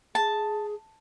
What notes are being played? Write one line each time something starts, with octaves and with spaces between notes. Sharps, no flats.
G#4 A5